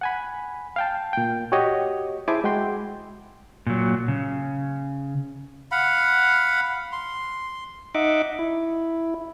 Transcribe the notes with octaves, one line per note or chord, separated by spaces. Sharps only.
F#5 G#5 B5
F5 G5 A5
A#2 G5
F#4 G4 C#5 D#5
E4 G#4 C5 G#5 A5 D6
G#3 F#4 G5 C6
A#2 F#3
C#3
F5 F#5 B5
C6
D#4 D#5 E5 F#5 D6
E4